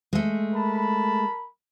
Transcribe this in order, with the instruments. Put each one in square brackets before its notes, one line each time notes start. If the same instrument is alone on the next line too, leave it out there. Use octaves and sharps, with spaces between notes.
[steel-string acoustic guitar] G#3 A3
[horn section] A#4 A5 B5